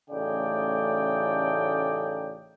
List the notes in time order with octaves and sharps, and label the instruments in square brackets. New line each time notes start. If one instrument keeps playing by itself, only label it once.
[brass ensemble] A1 C#3 A3 D#4 D5 G5